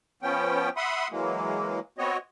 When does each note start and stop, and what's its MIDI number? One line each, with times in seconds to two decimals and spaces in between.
0.23 0.69 53
0.23 0.69 59
0.23 0.69 61
0.23 0.69 79
0.77 1.08 76
0.77 1.08 78
0.77 1.08 83
0.77 1.08 84
0.77 1.08 87
1.11 1.79 52
1.11 1.79 54
1.11 1.79 56
1.11 1.79 58
1.98 2.17 59
1.98 2.17 60
1.98 2.17 66
1.98 2.17 73
1.98 2.17 75